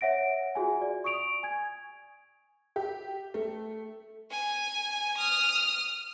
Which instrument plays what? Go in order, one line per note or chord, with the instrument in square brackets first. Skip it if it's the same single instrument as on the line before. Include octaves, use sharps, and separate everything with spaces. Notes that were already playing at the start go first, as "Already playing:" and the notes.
[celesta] C#5 E5 F#5 A#6 D7
F4 F#4 G#4 G#5
D5
C#6 D#6 D7 F7
G#5 G#6
[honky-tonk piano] G4
A3
[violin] G#5
D#6 F6